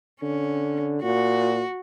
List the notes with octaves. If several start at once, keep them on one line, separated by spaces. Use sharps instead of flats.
D3 C#4
A#2 F#4